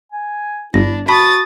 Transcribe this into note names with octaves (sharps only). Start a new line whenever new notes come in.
G#5
G1 D4 E4 A#6
F#4 A5 B5 D#6 A6 B6